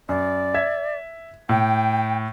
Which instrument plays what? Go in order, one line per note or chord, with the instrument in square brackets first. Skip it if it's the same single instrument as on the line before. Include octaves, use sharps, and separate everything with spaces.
[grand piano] F#2 [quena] D5
[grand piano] E5 G#6
[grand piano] A2 [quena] G5